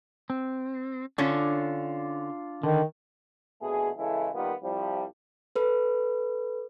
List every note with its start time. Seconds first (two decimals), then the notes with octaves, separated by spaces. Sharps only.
0.30 C4
1.18 D3 C#4 D4 F4 C#5
2.63 D3 D#3
3.62 A#1 B2 A3 G#4
3.97 C#3 E3 G#3 E4 G#4 A4
4.34 D#3 G3 A#3 B3 F4
4.63 C2 F3 G3
5.56 A4 B4